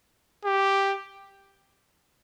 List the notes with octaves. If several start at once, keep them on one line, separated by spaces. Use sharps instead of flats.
G4